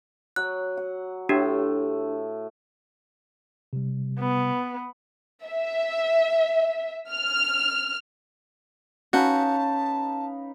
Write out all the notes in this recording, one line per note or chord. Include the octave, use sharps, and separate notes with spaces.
F#3 F#5 F#6
F#5
A2 A3 D4 G4 G5
C3 G3
B3
E5
F6
C#4 D#4 F#4 B4 F5 F#5 A5 G6